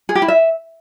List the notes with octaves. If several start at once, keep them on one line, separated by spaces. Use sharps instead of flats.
G#4
G4
E4
E5